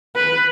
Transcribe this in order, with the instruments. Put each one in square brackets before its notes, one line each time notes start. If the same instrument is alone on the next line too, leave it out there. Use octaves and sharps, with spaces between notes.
[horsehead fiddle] B4